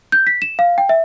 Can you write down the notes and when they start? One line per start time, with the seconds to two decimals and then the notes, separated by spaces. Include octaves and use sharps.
0.12 G6
0.27 B6
0.42 E7
0.59 F5
0.78 G5
0.89 E5